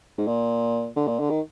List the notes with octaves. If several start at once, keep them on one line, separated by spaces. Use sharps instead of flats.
G#2
A#2
D3
A#2
D3
D#3